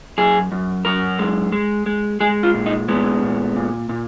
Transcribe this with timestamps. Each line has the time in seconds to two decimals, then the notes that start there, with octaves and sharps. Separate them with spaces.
0.18 F#2 G#4
0.52 F#2
0.85 F#2 A#4
1.19 G#3
1.52 G#3
1.86 G#3
2.20 G#3 G#4
2.43 F4
2.54 A#2
2.66 D#4
2.88 G#3 B3
3.22 A#2
3.56 A#2
3.89 A#2